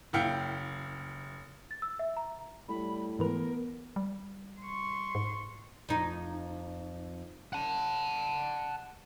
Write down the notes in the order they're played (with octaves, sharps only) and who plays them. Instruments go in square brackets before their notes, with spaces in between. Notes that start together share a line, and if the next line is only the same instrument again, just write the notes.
[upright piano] F#1 E4 F5 G5 C#7
[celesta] A6
E6
E5
A#5
[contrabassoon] A2 [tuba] G3 [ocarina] B5
[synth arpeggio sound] G#2 E3 B4 [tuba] B3 [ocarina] A#4
[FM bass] G3
[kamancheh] C6 C#6
[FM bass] G#2
[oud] F2 D#4
[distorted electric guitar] F#5 A5